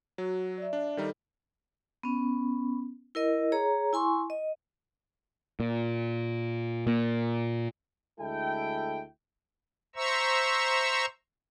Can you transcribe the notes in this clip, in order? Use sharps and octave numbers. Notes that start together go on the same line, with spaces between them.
F#3 F#4
D5 E5
D4
D#3 G3 D#4 A4
B3 C#4
E4 A#4 D#5
G#4 C#5 A#5
E4 G#5 C6 C#6
D#5
A#2
A#2
D2 G#3 E4 A4 G5
C5 E5 A#5 C#6 E6